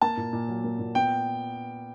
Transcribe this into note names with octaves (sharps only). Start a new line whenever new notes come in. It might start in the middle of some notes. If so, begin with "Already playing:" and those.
A#3 A5
A#2
A#2
F#3
A#3
A#2
B3 G5